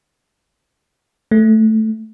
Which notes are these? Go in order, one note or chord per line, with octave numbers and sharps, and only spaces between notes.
A3